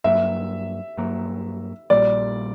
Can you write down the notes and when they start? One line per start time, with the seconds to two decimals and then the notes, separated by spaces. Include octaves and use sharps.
0.04 G2 F#3 A#3 E5
0.97 G2 F#3 A#3
1.90 A#1 A#2 G3 D5